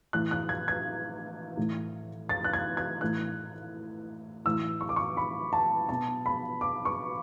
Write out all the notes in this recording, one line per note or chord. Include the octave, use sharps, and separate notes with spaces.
A2 E3 F#6
F#6
G#6
G#6
A2 E3
A6
F#6
G#6
G#6
A2 E3 F#6
A2 E3 E6
C#6
D6
C#6
B5
A5
B2 A5
B5
D6
C#6